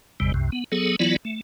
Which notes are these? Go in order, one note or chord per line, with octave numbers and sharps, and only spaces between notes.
G#1 E2 C3 G3
C2 F#2 C3
B3
F#3 B3 G#4 A4
E3 F#3 B3 E4 F4 D5
A3